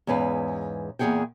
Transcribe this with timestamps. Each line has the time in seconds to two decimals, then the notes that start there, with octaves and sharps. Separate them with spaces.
0.07 E2 G#2 C#4 B4 F5
0.99 E2 A#2 B3 G#4 F#5 G5